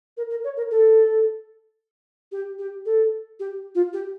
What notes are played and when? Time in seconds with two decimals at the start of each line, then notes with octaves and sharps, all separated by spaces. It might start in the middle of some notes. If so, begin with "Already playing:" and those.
0.17 A#4
0.30 A#4
0.44 C#5
0.57 A#4
0.71 A4
2.32 G4
2.59 G4
2.86 A4
3.40 G4
3.75 F4
3.93 G4